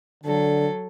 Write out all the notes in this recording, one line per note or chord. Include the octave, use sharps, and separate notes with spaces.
D3 F#3 A4